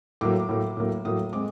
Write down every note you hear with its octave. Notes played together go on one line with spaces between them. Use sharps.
A2 F#3 A#3 D6
A2 F#3 A#3
A2 F#3 A#3
A2 F#3 A#3 D#6
G#3 C4 D6